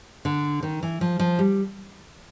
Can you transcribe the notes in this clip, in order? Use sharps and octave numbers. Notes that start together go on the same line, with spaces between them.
D3
D#3
E3
F3
F3
G3